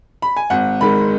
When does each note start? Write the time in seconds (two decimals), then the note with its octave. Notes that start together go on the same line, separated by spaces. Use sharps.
0.22 B5
0.36 G#5
0.50 G#1 F#5
0.81 G#2 D#3 G#3 B5